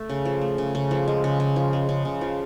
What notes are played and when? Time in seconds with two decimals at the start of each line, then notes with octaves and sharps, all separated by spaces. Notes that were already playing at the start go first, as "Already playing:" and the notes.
Already playing: A3
0.09 C#3
0.25 F3
0.41 A3
0.58 C#3
0.75 C#3
0.91 F3
1.08 G#3
1.24 C#3
1.40 C#3
1.56 F3
1.73 G#3
1.89 C#3
2.05 C#3
2.21 F3